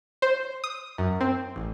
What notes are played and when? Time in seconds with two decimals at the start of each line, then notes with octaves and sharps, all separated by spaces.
0.22 C5
0.64 D#6
0.98 F#2
1.21 C4
1.56 A1